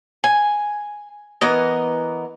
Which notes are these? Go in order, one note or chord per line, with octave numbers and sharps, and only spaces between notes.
G#5
E3 B3 A#4 D#5